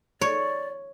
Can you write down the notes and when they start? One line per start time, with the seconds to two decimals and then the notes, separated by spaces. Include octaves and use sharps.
0.21 C#5 D5